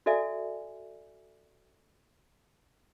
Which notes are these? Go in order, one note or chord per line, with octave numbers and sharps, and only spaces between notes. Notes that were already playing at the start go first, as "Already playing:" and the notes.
F#4 A4 D5 E5 G#5